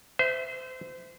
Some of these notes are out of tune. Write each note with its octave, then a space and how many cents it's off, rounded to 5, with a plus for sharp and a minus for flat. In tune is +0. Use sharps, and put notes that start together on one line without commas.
C5 -30 E5 +0